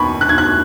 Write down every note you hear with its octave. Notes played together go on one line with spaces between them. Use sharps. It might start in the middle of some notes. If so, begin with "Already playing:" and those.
Already playing: D#2 B3 B5 C#6
F#6
G#6
F#6